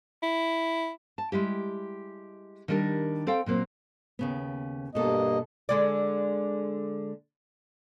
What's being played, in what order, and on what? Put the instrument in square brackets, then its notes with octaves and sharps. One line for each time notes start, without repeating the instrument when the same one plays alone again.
[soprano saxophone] E4
[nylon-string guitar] A5
G3 G#3 E4 G4
D#3 G3 D4 G4 A#4
C4 A4 F5 G5
A#2 F#3 A#3 C4
D#2 C#3 B3
[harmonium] G2 A#3 D#5 [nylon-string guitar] B2 A4
[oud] D3 G#3 D5